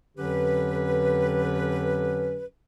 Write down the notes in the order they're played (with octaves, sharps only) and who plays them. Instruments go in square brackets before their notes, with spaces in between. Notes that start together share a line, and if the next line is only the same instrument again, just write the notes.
[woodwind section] F2 D3 F#3 C#4 G4 B4